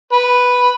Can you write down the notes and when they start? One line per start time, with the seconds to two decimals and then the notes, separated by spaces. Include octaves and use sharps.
0.12 B4